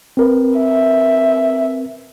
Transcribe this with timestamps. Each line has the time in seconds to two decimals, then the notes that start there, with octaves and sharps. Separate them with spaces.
0.17 C4 A#4 B4
0.59 E5